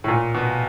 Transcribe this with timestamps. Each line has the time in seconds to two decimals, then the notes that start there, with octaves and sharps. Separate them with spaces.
0.04 A2
0.08 A#2
0.34 B2